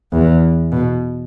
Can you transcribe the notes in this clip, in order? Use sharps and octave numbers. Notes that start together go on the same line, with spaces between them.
E2
B2